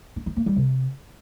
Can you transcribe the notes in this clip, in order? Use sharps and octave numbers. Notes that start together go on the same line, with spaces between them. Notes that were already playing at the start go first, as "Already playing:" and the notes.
D4
D#4
A#3
G3
C3